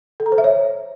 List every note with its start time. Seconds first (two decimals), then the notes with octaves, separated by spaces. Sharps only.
0.20 A4
0.26 A#5
0.32 C5
0.38 E5
0.44 C#5